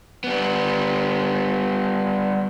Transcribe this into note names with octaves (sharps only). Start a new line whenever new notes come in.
G3 B3